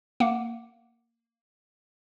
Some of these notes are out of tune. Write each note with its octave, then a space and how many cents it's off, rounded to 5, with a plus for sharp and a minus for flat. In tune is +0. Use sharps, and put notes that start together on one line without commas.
A#3 -10 F#5 +0 D6 +0